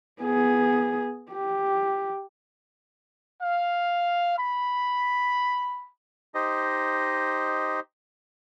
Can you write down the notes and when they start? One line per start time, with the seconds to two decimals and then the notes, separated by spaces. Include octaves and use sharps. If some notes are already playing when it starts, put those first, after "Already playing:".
0.22 B3 G#4
1.32 G4
3.42 F5
4.38 B5
6.35 D#4 G4 C5 D#5